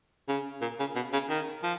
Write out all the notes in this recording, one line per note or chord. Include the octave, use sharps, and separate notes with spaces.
C#3
A#2
C#3
B2
C#3
D#3
F3